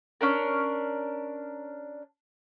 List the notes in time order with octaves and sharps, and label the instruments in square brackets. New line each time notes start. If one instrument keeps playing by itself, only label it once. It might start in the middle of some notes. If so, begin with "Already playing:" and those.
[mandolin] C#4 D4 A#4